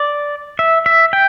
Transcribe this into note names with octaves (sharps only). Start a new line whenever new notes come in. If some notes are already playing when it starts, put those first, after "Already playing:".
Already playing: D5
E5
E5
G5